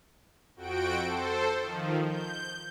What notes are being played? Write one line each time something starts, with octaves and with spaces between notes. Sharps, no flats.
F2 F#4 G5 D7
A4 C5
D#3 F3
G6